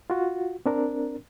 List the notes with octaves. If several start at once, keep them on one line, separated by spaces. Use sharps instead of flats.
F4 F#4
C4 D4 A#4